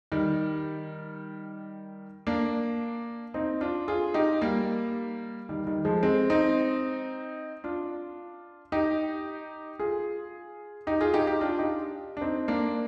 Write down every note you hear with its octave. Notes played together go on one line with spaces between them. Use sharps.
D#3 G3
A#3 D4
C4 D#4
D4 F4
F4 G#4
D#4 G4
G3 A#3
D#3 G3
D#3 G3
F3 G#3
G#3 C4
C4 D#4
D4 F4
D#4 G4
F4 G#4
D#4 G4
F4 G#4
D#4 G4
D#4 G4
D4 F4
D#4 G4
D4
C4 D#4
A#3 D4